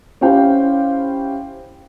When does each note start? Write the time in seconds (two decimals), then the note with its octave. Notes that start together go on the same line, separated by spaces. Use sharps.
0.21 C#4 E4 G4 C5 F5 G5